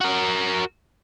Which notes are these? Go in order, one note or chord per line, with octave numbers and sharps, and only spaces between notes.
F#4 A#4